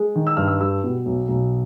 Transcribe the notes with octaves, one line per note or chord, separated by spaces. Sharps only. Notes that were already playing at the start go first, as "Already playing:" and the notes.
Already playing: G#3
D#3
E6
G2 F6
E6
G3 E6
B2
B1
B1